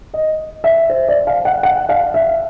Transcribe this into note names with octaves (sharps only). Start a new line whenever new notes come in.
D#5
E5
C5
D5
F5
F#5
F#5
F5
E5